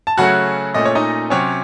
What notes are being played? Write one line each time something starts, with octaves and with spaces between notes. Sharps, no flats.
A5
C#3 F#3 A3 C#4 F#4 F#5
A#2 A3 C#4 D#5
C#5
D#4 D#5
C3 F#3 C4 C#4 C#5